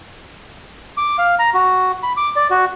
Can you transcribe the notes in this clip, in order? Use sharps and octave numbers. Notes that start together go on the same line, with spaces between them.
D6
F5
A#5
F#4
B5
D6
D5
F#4